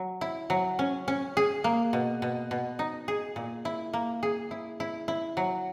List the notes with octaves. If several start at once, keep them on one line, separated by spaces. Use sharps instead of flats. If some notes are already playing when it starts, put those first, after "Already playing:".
Already playing: F#3
E4
F#3
C#4
C#4
G#4
A#3
B2
B2
B2
D#4
G#4
A#2
E4
A#3
G#4
E4
E4
E4
F#3